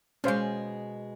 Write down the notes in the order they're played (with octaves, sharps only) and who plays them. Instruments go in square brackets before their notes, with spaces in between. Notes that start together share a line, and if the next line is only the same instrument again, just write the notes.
[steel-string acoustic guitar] B2 G#3 [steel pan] C#4 C5 F5